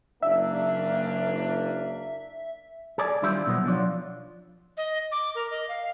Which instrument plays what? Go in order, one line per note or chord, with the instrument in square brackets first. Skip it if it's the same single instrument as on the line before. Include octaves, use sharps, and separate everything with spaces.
[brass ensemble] F#1 A#3 D4 [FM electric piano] E5
[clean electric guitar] G#4 D5
D#3 G3 D4 E4 F4 C5
B2 D#3 F3 F#3 B3
F3 F#3 D4 F4
[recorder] D#5
D6
A#4
D#5
F5